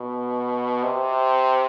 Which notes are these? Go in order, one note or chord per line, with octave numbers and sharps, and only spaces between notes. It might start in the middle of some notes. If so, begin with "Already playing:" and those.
Already playing: B2
C3